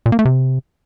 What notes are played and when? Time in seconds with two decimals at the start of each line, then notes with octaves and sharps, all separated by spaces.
0.06 A#2
0.12 A#3
0.19 A3
0.25 C3